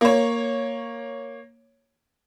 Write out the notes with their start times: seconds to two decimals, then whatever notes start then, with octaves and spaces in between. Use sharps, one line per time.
0.01 A#3 C#5